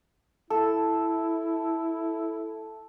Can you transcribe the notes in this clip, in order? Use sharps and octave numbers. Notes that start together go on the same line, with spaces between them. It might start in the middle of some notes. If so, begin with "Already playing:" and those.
E4 A4